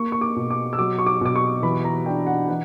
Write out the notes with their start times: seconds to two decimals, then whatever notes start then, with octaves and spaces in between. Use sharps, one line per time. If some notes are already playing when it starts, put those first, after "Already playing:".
Already playing: A#3 C#6
0.12 C#6
0.21 D6
0.36 B2
0.50 D6
0.73 E6
0.78 F#3 D6
0.98 C#6
1.06 D6
1.21 B2 D6
1.36 C#6
1.63 E3 B5
1.84 A#5
2.06 D4 G5
2.27 F#5
2.48 E3 F#5